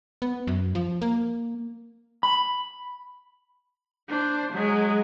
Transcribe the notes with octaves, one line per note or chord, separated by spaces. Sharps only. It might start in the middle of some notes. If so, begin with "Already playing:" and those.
B3
F#2
F3
A#3
B5
D4 C5
F#3 G#3